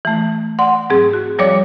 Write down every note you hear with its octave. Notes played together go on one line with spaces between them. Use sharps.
E3 A3
D5 F#5 C6
G#2 F#3 C4 G#4
F#4
F3 G3 C#5 D5 D6